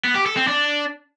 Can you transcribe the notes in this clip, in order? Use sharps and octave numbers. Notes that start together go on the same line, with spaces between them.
B3
G4
A4
C4
D4